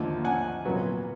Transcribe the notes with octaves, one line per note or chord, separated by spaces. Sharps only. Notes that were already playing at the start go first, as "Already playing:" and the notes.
Already playing: D#2 D3 F3 A3
F#5 G#5
C2 A#2 F#3 B3